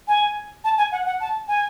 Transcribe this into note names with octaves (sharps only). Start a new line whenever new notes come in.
G#5
A5
G#5
F#5
F#5
A5
G#5